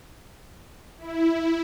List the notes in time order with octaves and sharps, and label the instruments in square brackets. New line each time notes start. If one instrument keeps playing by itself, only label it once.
[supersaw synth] E4